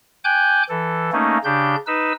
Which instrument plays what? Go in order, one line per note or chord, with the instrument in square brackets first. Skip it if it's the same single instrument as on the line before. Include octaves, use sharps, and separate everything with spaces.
[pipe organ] G5 G#5 D6 F#6 G6
E3 A4
A3 A#3 C#4 D#4
C#3 D4 G4 G6
D#4 B4 E6